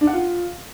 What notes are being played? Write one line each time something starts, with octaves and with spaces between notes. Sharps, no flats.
D4
F#5
F4